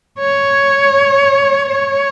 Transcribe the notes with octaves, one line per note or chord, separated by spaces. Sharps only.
C#5
C#5